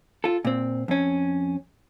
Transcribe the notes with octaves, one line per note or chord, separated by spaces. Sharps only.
F4 A4
A#2 C4
F2 C#4